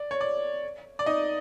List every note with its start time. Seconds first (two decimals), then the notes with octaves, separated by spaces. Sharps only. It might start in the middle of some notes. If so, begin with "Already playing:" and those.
Already playing: D5
0.11 C#5
0.21 D5
0.99 D5
1.06 D#4 D#5